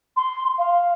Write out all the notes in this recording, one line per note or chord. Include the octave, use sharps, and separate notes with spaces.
C6
F5